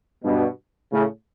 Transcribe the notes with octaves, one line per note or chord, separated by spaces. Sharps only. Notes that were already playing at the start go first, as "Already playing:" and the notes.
G2 B2
A2 C#3